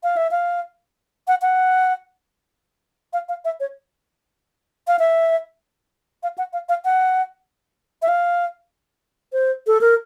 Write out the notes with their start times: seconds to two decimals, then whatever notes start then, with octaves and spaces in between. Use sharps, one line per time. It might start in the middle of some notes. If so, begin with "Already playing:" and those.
0.03 F5
0.17 E5
0.31 F5
1.28 F#5
1.42 F#5
3.13 F5
3.29 F5
3.45 E5
3.60 C#5
4.87 F5
4.99 E5
6.23 F5
6.38 F#5
6.53 F5
6.69 F5
6.85 F#5
8.02 E5
8.08 F5
9.33 C5
9.67 A4
9.81 A#4